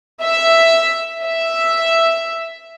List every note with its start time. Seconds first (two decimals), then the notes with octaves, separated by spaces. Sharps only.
0.23 E5
1.24 E5